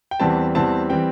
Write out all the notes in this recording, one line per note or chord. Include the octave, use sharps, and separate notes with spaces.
G5
E2 E3 G3 C4 A5
E2 E3 G3 C4 A5
E3 G3 C4 G5